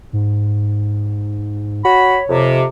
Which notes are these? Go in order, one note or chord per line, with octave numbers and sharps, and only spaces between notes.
G#2
F#4 C#5 B5
F2 C3